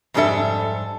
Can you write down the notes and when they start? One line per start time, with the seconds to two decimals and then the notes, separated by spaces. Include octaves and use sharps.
0.14 F2 G#2 G3 D4 A4 E5